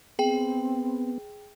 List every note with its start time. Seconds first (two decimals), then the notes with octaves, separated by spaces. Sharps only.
0.19 B3 C4 G#4 G5